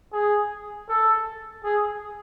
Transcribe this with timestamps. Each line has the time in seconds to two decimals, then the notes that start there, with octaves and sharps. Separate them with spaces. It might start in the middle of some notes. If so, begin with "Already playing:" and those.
0.13 G#4
0.89 A4
1.64 G#4